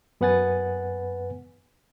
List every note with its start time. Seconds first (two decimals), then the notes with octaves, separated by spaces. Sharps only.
0.21 F#2 B3 B4 F#5 G#5 A6